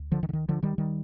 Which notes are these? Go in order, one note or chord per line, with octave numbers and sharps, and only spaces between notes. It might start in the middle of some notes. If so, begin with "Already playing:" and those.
Already playing: D2
D3 F3
D#3
D3
D#3
D3 F3
D#3 G3
D#3 G3